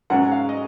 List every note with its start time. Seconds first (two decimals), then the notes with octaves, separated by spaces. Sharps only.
0.10 G#2 F#3 C#4 F#5
0.32 F5
0.49 D#5